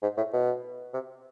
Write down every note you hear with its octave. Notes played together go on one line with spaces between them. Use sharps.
G#2
A2
B2
C3